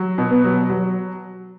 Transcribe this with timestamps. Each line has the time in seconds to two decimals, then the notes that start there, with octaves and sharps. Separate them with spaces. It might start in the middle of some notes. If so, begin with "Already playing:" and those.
Already playing: F#3
0.18 B2
0.31 B3
0.44 F#3
0.70 F#3